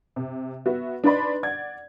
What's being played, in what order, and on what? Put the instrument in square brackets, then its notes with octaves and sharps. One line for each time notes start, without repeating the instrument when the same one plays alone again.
[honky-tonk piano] C3
B3 F#4 E5
D4 D#4 B4 D5 B5 C6
D5 F#5 G#6